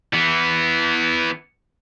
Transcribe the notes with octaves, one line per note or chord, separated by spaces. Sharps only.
E3 B3